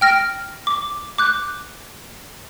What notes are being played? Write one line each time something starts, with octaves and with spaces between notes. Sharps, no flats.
G5 F6 A#6 D7
D6
D6 F#6 G6